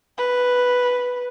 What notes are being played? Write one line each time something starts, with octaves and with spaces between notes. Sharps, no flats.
B4